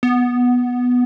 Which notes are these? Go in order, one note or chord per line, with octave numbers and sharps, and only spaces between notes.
B3